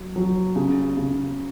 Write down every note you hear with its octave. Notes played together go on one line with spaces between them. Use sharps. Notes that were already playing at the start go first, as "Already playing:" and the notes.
Already playing: F#3
F#3
C#3
C#3